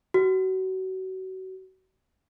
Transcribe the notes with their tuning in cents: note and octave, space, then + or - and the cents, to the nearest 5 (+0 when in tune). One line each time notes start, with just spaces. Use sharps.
F#4 +30